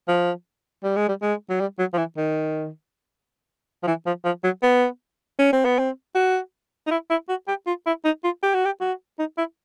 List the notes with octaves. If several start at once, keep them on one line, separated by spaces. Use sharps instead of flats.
F3
G3
G#3
G3
G#3
F#3
G3
F#3
F3
E3
D#3
F3
E3
F3
F3
F#3
B3
C#4
C4
B3
C4
F#4
D#4
E4
E4
F#4
G4
F4
E4
D#4
F4
G4
F#4
G4
F#4
D#4
E4